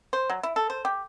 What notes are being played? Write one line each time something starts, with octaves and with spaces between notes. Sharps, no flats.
C5
F#3
E4
A4
C5
G4